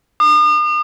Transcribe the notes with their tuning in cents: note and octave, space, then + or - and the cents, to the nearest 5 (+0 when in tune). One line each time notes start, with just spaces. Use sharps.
D#6 -45